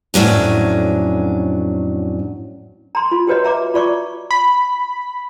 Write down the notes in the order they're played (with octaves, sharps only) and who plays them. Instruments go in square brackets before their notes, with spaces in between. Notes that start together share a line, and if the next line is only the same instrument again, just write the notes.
[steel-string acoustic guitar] F2 A2 F#3 C#4 D4
[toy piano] A#5 C6
F4
F#4 G4 B4 C#5 D#5
E5 A#5 D6
F4 D5 C#6 D6
[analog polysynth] B5